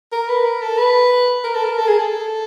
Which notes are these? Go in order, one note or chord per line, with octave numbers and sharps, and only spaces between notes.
A#4
B4
A#4
A4
B4
A#4
A4
A#4
A4
G#4
A4